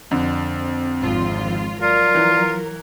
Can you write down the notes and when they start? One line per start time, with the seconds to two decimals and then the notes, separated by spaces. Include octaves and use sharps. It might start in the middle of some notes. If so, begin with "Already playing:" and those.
0.11 F2 D3 C4
1.01 G#1 F3 F4
1.82 F#3 F4 A#4 D5
2.15 E3